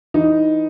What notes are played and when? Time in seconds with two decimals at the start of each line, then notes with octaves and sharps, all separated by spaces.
0.14 E3 D#4